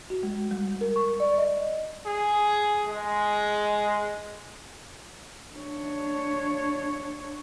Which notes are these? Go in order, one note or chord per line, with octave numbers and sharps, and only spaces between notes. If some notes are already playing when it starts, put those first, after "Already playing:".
F#4
G#3
G3
A#4
C#6
D5
D#5
G#4
G#3
D4 C#5